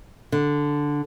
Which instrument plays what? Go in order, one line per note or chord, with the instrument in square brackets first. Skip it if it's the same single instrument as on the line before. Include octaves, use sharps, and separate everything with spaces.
[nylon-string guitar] D3